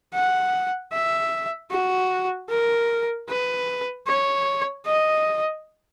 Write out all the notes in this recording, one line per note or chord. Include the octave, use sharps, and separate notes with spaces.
F#5
E5
F#4
A#4
B4
C#5
D#5